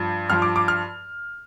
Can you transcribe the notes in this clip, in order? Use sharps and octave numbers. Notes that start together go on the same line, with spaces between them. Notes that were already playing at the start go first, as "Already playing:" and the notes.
Already playing: G2 F3
G2 F3 F6
D6
D6
F6